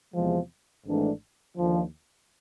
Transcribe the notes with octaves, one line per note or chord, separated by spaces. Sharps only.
E2 C3 F3 G#3
G#1 G#2 E3 A3 D4
D#2 D3 F3